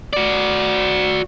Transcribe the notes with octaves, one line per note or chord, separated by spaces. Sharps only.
F#4 D5